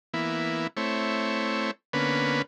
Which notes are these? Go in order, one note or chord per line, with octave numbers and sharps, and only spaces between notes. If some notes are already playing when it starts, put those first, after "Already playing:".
E3 A#3 B3 E4
A3 C4 E4 C#5
D3 A#3 B3 C#4 B4